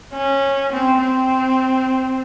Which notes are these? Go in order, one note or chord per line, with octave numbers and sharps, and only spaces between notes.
C#4
C4
C4